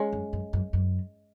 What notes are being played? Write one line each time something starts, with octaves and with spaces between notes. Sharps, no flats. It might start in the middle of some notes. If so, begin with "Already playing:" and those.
Already playing: G#3 C#4
F#2
F#2
F#2
F#2